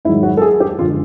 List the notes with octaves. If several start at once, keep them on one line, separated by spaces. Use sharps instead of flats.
G#2 D#3 F#3 E4
F#4
A4
G#4
G4
F#2 D3 F3 G#3 F4